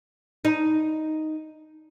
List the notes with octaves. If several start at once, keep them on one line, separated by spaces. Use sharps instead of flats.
D#4